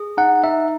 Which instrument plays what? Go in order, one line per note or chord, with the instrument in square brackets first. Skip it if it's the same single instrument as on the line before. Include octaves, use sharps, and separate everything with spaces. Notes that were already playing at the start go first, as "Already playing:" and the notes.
Already playing: [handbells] G#4
[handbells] D#4 [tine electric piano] F#5
[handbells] D#4 [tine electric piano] E5